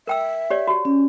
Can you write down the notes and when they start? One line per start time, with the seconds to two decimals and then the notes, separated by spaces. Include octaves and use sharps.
0.07 A#4 E5 G5 E6
0.50 G4 C#5 D5
0.67 F#4 G4
0.85 C#4